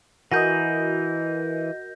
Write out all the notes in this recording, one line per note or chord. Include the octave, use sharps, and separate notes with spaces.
E3 F#4 A#4 D#5 G#5 G6 A#6